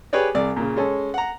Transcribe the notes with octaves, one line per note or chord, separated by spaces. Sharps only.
G4 G#4 B4 C#5 D5
C2 G#4 D5
A#2 C#3
G#3 C#4 A4
F#5 A#5